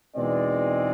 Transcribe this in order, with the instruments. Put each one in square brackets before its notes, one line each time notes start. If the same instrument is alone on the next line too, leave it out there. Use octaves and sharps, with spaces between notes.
[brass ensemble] E2 B2 G#3 C4 D#4 D5